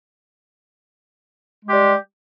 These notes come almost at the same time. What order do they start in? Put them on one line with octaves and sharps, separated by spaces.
G#3 G4 G3